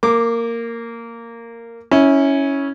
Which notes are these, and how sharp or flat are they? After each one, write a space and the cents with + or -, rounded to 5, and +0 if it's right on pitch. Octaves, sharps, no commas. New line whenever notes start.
A#3 -10 D6 +0
C#4 +0 E4 -25